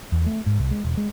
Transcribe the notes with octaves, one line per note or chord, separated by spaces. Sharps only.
E2
A3
G#2
C2
G#3
E1
G#3